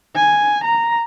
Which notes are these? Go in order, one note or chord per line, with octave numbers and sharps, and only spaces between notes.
G#5
A#5